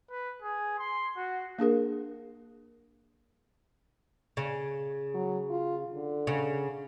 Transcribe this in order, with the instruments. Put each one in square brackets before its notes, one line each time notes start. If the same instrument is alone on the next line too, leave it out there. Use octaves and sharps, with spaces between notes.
[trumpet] B4
G#4
C6
F#4
[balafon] A#3 D4 G#4 A#4
[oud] C#3
[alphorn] F#3
F4
D3
[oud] C#3